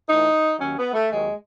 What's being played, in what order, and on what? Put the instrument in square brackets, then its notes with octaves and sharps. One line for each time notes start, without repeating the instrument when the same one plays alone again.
[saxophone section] A2 E3 D#4
D#2 D#3 F#3 C#4
B3
A3
D#2 D#3 F#3 G#3